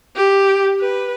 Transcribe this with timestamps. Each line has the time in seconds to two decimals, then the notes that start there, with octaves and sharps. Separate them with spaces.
0.16 G4
0.80 B4